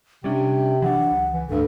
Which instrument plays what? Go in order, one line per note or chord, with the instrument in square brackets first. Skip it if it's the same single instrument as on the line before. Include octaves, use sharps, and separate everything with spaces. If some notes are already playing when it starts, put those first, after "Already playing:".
[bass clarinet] C3 [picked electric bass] G3 C#4 D4 [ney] G5
[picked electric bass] E3 F#3 D4 [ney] F#5
[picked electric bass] C#2
[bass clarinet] E3
[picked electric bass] D1 D2 [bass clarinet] G2 [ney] A4